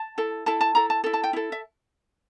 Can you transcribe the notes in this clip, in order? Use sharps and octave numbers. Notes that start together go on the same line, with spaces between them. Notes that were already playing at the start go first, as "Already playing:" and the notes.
Already playing: A5
E4 A4
E4 A4 A5
A5
E4 A4 A#5
A5
E4 A4
A5
G5
E4 A4
E5